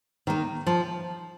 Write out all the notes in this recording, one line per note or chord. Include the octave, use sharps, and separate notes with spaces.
D#3 A#3
F3